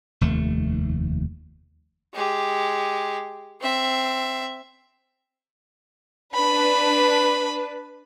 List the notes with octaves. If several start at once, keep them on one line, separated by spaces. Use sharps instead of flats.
F1 D#2 A3
G#3 G4
C4 E5
D4 B4 B5